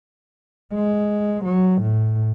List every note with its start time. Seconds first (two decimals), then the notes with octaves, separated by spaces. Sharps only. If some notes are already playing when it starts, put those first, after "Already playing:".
0.73 G#3
1.45 F#3
1.82 A2